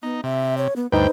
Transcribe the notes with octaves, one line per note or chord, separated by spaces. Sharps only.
B3 D#4
C3 E5
C#5
B3
D2 G2 D#4 B4 C5 G5